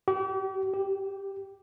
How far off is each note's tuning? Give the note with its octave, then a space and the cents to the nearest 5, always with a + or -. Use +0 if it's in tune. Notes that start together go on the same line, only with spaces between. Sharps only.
G4 -40
G4 +0